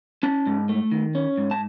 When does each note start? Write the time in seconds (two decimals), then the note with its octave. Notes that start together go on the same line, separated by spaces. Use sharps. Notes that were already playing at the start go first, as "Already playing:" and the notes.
0.23 C#4 A5
0.47 G#2
0.69 A3
0.92 D#3
1.15 C#4
1.38 G#2
1.51 A5